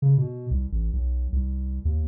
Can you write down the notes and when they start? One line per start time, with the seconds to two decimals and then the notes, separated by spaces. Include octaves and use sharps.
0.02 C#3
0.18 B2
0.51 C2
0.72 A1
0.93 B1
1.32 C2
1.85 D#2